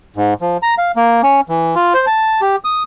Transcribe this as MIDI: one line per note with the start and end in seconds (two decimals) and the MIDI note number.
0.16 0.34 44
0.41 0.57 53
0.63 0.75 82
0.78 0.92 77
0.96 1.22 58
1.23 1.41 61
1.49 1.75 52
1.75 1.93 65
1.94 2.06 72
2.07 2.41 81
2.41 2.56 67
2.64 2.83 87